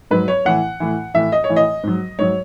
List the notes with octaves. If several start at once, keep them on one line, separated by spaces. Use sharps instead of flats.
G#2 F#3 B4
C#5
A2 E3 F#5
A2 E3
A2 E3 E5
D#5
C#5
A2 E3
D#5
G#2 F#3
G#2 F#3 C#5